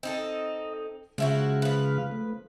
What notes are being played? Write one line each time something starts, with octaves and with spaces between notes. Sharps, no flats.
C4 D#4 A4 D#5
C#3 F3 G#3 E4 F#4 F5
F3 B4
A3